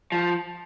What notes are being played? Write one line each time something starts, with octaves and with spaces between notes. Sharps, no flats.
F3